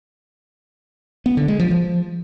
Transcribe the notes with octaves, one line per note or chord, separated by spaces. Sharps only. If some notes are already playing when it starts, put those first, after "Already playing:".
B3
D3
G#3
F3
F3